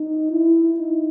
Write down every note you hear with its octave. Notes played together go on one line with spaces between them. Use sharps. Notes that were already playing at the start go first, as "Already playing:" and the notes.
Already playing: D#4
E4
D#4